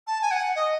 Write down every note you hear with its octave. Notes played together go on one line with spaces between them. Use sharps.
A5
G#5
F#5
D#5